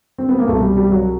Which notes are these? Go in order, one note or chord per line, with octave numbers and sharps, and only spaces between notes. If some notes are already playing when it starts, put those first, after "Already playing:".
C4
B3
A#3
C2 B2 A3
G3
G3
F#3